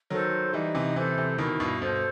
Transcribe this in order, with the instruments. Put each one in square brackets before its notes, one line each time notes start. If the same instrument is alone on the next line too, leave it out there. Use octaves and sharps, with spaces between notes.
[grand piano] D#3 F#3 [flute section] A4 C5
[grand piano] E3 G3 [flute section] D#4
[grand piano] C3 E3
[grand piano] C3 E3 [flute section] A4 C5
[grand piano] C3 E3
[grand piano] B2 D#3 [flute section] E4
[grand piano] G2 B2
[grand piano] G2 B2 [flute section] A4 C5